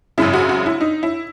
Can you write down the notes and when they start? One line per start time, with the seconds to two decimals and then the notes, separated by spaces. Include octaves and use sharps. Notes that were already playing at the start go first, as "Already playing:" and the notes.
0.18 G#1 F#2 C#3 E4
0.33 F#4
0.49 F#4
0.66 E4
0.81 D#4
1.03 E4